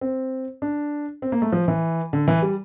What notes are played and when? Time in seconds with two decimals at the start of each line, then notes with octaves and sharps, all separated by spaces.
0.01 C4
0.62 D4
1.22 C4
1.32 A#3
1.42 A3
1.52 F3
1.68 E3
2.13 D3
2.28 E3
2.42 G3